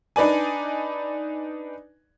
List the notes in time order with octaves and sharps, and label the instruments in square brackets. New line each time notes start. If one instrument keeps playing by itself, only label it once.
[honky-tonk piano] D4 D#4 B4 D5 G#5